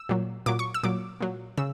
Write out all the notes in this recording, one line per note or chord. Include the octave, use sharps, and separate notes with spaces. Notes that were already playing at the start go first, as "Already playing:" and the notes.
Already playing: E6
A#2 F#3
A#2 F#3 D6
C#6
E6
A#2 F#3 D6
A#2 F#3
C#3 E6